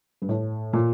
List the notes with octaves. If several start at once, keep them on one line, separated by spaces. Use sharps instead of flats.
G2
A2
A#2